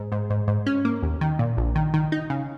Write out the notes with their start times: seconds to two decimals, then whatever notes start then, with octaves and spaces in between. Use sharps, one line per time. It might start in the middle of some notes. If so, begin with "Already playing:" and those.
Already playing: G#2
0.12 G#2
0.30 G#2
0.48 G#2
0.66 C#4
0.85 A#3
1.03 D#2
1.21 D#3
1.39 A#2
1.57 A#1
1.75 D#3
1.94 D#3
2.12 D#4
2.30 C#3